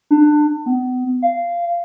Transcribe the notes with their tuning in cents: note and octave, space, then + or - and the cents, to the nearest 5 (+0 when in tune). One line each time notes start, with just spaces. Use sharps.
D4 +25
B3 +35
F5 -15